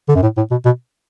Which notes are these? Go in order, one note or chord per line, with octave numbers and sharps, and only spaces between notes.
D3
F#2
A2
A2
B2
B2